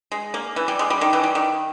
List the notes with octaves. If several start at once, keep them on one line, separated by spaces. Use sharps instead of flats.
G#3
A#3
E3
G3
G#3
G3
D#3
E3
G3
D#3